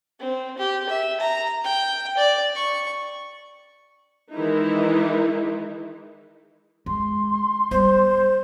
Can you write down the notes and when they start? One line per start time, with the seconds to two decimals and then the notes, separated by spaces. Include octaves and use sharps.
0.20 C4
0.58 G4
0.89 E5
1.21 A#5
1.64 G5
2.18 D5
2.55 C#6
4.33 D#3 E3 G#3 D#4 E4
6.86 G#3 C6
7.71 G3 B3 C5